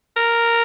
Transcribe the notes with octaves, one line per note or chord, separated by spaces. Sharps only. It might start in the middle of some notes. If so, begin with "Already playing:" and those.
A#4